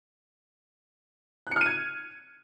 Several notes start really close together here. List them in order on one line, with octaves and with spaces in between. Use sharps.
F#6 C#7 F6 D#7 G#6